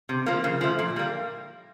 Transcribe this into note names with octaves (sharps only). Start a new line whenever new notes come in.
C3
F3 A#3
C#3
F3 A3
A#2
G3 A#3